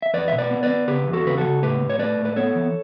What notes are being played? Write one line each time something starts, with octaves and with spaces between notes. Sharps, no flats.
E5
E2 B4 D5
B2 E5
B4 D5
B3
B4 D5
B3
C#3 G4 B4
E2
F#4 A4
C#3 B4
F#4 A4
C#3
A2 G4 B4
A2
C#5
A3 B4 D5
A2
B4
B3 A4 C#5
E3